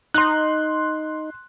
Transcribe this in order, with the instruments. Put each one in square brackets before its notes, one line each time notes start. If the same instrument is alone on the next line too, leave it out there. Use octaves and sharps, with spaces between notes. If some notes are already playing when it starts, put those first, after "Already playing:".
[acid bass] D#4 [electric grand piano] C6 F#6